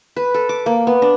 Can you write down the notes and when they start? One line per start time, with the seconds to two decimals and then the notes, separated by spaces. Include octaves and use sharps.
0.16 B4
0.34 A4
0.49 D6
0.66 A#3
0.87 B3
1.02 D4